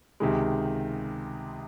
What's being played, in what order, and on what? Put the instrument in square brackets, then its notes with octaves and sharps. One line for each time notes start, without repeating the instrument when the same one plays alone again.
[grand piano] C#2 C3 D#3 G#3